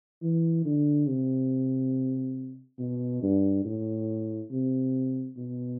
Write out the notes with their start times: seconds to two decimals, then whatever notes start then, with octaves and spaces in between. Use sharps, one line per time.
0.23 E3
0.65 D3
1.08 C3
2.79 B2
3.23 G2
3.65 A2
4.52 C3
5.37 B2